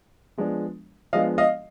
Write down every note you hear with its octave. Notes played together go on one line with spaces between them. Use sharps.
F3 G#3 B3 D4
F3 G#3 B3 D4 D#5 F5
D#5 F5